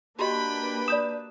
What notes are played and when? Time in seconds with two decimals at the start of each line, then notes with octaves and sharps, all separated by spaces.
0.19 A#3 D4 F#4 G4 B4 D#5 G5 B5
0.88 D5 D#6 G6 E7